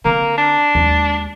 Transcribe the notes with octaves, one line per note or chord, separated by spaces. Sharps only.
D3 A#3 C4
D4
D#2 G#3